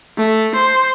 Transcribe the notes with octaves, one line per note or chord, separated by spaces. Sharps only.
A3
C5